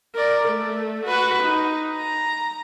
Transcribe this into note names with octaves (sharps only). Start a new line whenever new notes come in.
A#4 D5
A3
F#4 B4
D#4
A#5